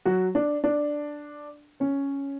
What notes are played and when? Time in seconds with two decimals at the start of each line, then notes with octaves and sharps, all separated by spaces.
0.05 F#3 F#4
0.35 D4
0.64 D4
1.80 C#4 C#5